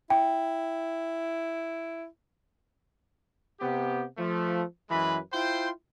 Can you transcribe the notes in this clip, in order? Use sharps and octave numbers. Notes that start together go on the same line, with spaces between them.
E4 G5
C3 B3 G4
F3 A3
F#2 E3 G#3 B4 B5
E4 F4 C5 G5 C6